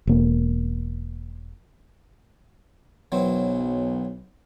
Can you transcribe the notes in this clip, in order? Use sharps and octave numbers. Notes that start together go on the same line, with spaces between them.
E1 A#3
B1 E3 F#3 C4